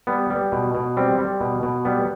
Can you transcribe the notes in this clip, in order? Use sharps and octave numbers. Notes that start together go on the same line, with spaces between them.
G3 B3
G3
B2
B2
G3 C4
G3
B2
B2
G3 B3